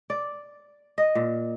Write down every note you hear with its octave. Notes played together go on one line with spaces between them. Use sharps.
D5
D#5
A#2